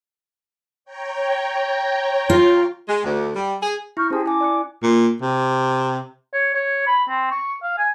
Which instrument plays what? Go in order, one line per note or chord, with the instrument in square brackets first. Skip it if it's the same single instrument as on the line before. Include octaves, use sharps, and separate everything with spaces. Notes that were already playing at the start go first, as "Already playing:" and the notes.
[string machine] C#5 G5 A#5
[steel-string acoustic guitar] F4
[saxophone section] G#3
D2
G3
G#4
[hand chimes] E4 [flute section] C#6 F6 G6
[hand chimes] C#4 A5 [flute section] G4 G#4 C5
[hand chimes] E4 G#5 [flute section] D6
[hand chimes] D5 F#6 C#7
[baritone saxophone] A#2
C3
[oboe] C#5
C#5
B5
C4
C#6
F5
G#5